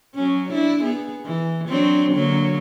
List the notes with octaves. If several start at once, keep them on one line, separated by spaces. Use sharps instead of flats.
F#3 C#4
D4 E4
B3 G#4
E3
F#3 C4 D4
D3 F#3 A#3